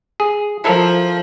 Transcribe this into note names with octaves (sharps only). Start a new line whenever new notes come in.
G#4
F3 E4 A4 A#4